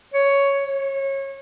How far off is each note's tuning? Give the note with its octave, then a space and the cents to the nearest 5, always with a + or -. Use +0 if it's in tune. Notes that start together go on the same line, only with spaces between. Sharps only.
C#5 +5
C#5 -25